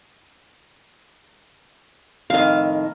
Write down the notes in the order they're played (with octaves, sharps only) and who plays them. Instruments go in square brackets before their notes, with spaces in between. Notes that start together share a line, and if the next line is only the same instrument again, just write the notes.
[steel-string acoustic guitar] F2 A2 D#3 [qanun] F5